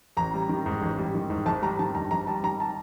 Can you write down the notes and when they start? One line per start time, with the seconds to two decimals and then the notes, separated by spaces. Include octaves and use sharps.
0.17 A1 A#5
0.34 G3
0.49 D#3
0.66 G#2
0.81 A1
0.98 G3
1.15 D#3
1.30 G#2
1.46 G#1 A5
1.62 G3 A#5
1.79 D#3 A5
1.95 G2 A#5
2.11 G#1 A#5
2.27 G3 A5
2.43 D#3 A#5
2.60 A5